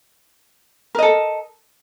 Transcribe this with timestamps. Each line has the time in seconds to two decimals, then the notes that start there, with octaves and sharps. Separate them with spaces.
0.95 A#4
0.99 D#5
1.02 A4